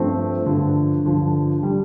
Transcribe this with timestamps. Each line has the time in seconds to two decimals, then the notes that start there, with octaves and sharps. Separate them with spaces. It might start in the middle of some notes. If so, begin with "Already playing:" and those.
Already playing: G2 F3 A3 C4
0.45 G2 D3 F3
1.05 G2 D3 F3
1.63 D3 G3